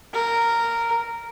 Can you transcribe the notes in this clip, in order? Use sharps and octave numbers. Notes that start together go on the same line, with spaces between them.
A#4